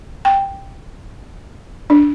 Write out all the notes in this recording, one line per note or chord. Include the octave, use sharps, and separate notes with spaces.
G5
D4